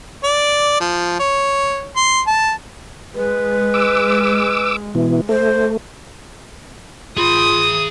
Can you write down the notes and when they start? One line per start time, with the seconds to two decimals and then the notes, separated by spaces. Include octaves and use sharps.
0.24 D5
0.81 F3
1.20 C#5
1.97 C6
2.27 A5
3.15 G#3 B4
3.74 D6 E6
4.95 B2 E3
5.29 A3 C5
7.18 F4 G#4 B5 D#6